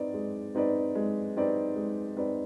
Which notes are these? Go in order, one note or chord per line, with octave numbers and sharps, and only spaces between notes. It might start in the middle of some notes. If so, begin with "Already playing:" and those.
Already playing: C4 D#4 B4 D5
G#3
C4 D#4 B4 D5
G#3
C4 D#4 B4 D5
G#3
C4 D#4 B4 D5